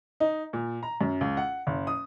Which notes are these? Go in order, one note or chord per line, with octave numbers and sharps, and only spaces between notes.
D#4
A#2
A#5
F#2
C#2
F#5
F#1
D#6